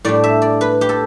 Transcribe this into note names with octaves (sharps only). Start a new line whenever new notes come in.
A2 G3 D4 D5
E5
D5
B4
G4
A4